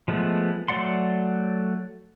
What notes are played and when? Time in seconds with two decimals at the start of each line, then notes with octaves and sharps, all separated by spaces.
0.08 F3 G#3 A3 B3
0.68 F#3 A3 D5 F#5 C6